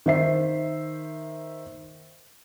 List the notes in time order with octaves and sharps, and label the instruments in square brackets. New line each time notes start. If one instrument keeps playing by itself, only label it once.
[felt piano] D#3 C5 E5 C7